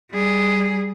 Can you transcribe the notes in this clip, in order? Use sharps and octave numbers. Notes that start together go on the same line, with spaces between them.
G3 G#4